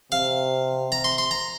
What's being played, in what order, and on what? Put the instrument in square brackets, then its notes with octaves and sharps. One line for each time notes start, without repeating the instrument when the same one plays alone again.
[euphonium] C3 [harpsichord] F5
[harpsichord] A#5
C6
C6
A#5